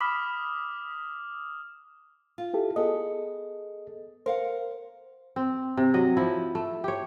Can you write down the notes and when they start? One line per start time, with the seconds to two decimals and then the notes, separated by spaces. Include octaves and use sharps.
0.01 B5 D6 D#6 F6
2.38 F4
2.54 E4 G4 A4
2.76 B3 G#4 A4 D#5
4.26 A#4 C5 F5 F#5
5.36 C4
5.77 C3
5.94 F#3 D#5
6.17 F3 E4
6.55 A3
6.84 G4 C#5